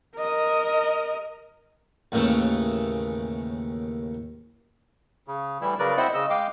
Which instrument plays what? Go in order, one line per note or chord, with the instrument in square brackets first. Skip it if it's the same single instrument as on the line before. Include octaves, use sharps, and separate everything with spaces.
[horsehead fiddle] A#4 D#5
[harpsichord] D#2 A2 C#3 E3
[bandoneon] C#3
A2 E3 G3 E4
C#3 F#3 A#4 B4 D5
C4 E4 C5 D#5 E5 F#5
C#3 D#5 E6
G#3 F5 G5 D6